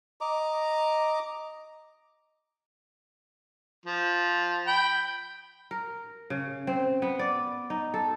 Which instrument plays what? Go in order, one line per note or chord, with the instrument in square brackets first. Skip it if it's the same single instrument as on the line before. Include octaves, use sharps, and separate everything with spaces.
[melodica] D#5 A#5 D6
[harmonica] F3
G5 B5
[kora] A#4
C#3
C4
B3
D5
D#4
A4